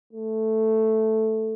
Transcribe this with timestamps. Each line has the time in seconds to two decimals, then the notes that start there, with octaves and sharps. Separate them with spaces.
0.13 A3